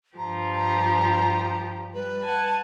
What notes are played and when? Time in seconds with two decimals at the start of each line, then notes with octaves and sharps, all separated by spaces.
0.18 G2 F3 G4 A#5
0.55 A#5
1.94 G3 B4
2.24 F#5 G#5 A5